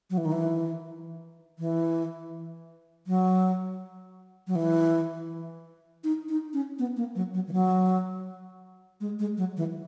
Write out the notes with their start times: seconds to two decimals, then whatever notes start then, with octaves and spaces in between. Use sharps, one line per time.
0.10 F#3
0.18 E3
0.25 D#3
0.32 E3
1.59 E3
3.07 F#3
4.47 F#3
4.55 E3
6.04 D#4
6.29 D#4
6.53 C#4
6.79 B3
6.97 A#3
7.15 F#3
7.34 F#3
7.48 E3
7.53 F#3
9.01 G#3
9.19 G#3
9.37 F#3
9.57 E3